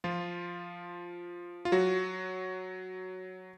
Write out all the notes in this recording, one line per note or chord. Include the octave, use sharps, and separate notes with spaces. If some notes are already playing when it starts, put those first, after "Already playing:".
F3 F4
F4
F#3 F#4